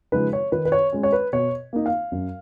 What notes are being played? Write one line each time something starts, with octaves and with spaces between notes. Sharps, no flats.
C#3 F3 G#3 D#4 B4
C#5
D#3 B4
B4
C#5
G#3 C#4
C#5
B4
B2 C#5
A#3 D#4
F5
F#2